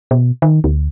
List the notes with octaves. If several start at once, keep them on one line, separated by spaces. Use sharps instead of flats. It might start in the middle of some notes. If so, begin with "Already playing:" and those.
B2
D#3
D2